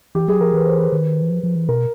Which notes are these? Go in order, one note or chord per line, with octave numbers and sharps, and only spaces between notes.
E3 G4
F#3 G#4
F3 A#4
E3 B4
C5
B4
D#3
E3
F3
F3
E3
B2 A#4